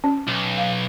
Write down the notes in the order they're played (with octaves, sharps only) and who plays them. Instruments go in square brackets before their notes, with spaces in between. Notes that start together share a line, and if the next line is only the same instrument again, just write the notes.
[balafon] C#4
[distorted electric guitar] B1
[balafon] F5